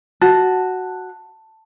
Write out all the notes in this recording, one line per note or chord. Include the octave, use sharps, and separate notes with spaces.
F#4 A5